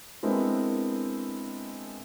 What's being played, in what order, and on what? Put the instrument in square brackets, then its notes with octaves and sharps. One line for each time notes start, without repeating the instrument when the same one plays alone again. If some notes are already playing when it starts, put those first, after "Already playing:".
[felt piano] G#3 B3 C4 D4 E4 A#4